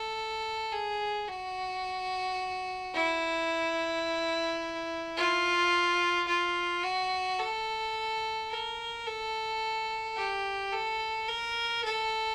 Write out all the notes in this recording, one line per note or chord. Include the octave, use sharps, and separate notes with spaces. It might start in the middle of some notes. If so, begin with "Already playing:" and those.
Already playing: A4
G#4
F#4
E4
F4
F4
F#4
A4
A#4
A4
G4
A4
A#4
A4